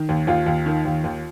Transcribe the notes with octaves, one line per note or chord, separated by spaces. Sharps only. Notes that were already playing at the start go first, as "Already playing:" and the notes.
Already playing: D#3
D#2
D#2 F4
D#2
D#3
D#2
D#2